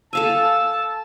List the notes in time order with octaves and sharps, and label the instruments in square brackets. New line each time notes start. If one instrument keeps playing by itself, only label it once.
[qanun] A4 F5 G#5 [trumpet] A5 [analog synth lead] E6